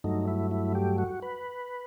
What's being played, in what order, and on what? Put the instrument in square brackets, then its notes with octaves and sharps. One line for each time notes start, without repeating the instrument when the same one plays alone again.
[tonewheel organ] G2 F#3 A3 D#4
E4
E4
G4
F#4
B4